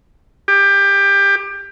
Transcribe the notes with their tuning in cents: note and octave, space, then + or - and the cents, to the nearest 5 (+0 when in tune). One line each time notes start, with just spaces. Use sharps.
G4 +20